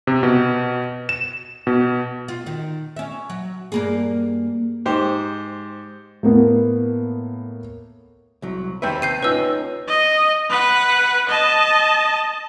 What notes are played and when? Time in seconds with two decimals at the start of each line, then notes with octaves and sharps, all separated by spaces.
0.07 C3
0.23 B2
1.09 E7
1.67 B2
2.28 F4
2.46 D#3
2.96 C#4 E5
3.30 F#3
3.72 G2 A#3 G#4
4.86 G#2 G4 C5
6.23 A2 A#3 B3
8.42 C2 F#3
8.82 D#2 B4 C5 E5
9.02 C3 G6 C7 D#7
9.23 C#4 D#4 F4 B4 E6
9.88 D#5
10.50 B4 F#5
11.29 D#5 A5